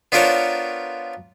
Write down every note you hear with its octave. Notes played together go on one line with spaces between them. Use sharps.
B3 D4 F4 A#4 C5 C#5